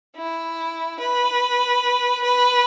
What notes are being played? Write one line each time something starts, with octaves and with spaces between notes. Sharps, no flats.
E4
B4
B4